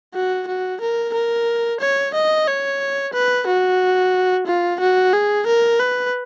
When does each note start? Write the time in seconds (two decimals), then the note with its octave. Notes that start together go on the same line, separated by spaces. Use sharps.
0.14 F#4
0.47 F#4
0.81 A#4
1.14 A#4
1.80 C#5
2.14 D#5
2.47 C#5
3.13 B4
3.47 F#4
4.46 F4
4.80 F#4
5.13 G#4
5.47 A#4
5.80 B4